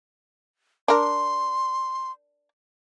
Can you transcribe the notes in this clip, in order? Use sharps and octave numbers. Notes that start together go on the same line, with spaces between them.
D4 A#4 C6